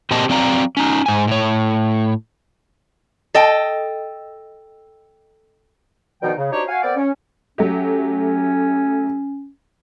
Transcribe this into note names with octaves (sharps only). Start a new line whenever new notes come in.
A#2 C4 G4 D#5 A5
F#3 C4 D5 F5 A#5
C#4 D#4
G#2 G#5
A2 C#5
A4 D#5 G5
B2 D3 D#3 F3 D#4 G5
C#3
D4 D#4 F#4 G4 C5 C#5
F#4 F5 G#5
B3 C4 A#4 D5
C#4
F#3 A3 C#4 G4